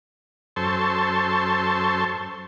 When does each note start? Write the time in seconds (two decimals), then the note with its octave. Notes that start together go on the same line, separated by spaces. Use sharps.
0.56 F#2 A4 C5 A5 C6 C#6